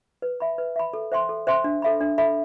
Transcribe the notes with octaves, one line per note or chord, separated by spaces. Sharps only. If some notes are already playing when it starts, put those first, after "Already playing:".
B4
E5 B5
B4
E5 B5
A4
C5 E5 G5 C6
A4
C5 E5 G5 C6
D4
A4 E5 B5
D4
A4 E5 B5